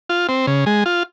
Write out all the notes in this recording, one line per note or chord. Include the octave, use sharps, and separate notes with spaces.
F4
C4
C#3
G#3
F4